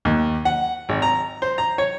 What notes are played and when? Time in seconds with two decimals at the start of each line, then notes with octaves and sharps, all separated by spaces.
0.05 D#2
0.45 F#5
0.89 G#1
1.02 A#5
1.42 C5
1.58 A#5
1.78 C#5